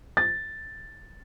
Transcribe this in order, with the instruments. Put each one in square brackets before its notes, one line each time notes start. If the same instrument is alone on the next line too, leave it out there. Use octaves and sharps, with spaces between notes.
[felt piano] A6